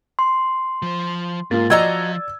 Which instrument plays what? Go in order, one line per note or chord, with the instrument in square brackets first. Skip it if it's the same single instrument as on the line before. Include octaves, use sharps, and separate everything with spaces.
[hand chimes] C6
[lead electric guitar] F3 C5
[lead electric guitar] G#2 [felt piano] A#3 F4 [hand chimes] A6
[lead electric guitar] F3 [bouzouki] F#4 D#5 A#5 [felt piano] D5 E6 G#6